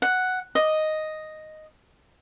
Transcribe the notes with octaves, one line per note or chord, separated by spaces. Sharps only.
F#5
D#5